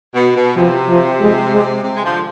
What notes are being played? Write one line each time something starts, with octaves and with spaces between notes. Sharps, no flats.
B2
B2
C3 F3
F3
G#3
G#3
C3
G#3
D3 F3